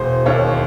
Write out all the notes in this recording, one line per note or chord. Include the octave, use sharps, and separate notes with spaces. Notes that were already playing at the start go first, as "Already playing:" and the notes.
Already playing: E1 C5
D#2 C#5